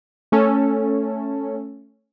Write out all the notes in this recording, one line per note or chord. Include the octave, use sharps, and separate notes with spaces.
A3 C#4 A4